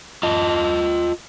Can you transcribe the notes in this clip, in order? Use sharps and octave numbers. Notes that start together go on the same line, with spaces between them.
F4 D#5 A5